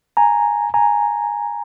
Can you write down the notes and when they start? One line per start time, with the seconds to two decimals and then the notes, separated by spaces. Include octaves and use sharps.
0.17 G#5 A#5
0.74 G#5 A#5